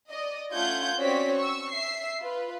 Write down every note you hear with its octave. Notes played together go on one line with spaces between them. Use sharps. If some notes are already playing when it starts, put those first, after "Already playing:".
D5 D#5
A3 C#4 F4 F#5 G6 G#6
C4 C#4 F#4 C#5 D5 B6
C#6 E6
E5 C7
F4 B4